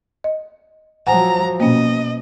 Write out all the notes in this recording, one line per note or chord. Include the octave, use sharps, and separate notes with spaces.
D#5
F3 F#3 F#5 G#5 A#5
B2 A#3 C#4 D#5